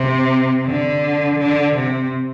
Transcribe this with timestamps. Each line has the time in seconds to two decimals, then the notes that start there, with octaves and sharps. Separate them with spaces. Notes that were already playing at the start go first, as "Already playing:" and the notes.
Already playing: C3
0.66 D3
1.39 D3
1.75 C3